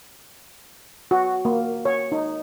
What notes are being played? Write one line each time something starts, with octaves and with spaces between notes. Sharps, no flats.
F#4
A#3
C#5
D#4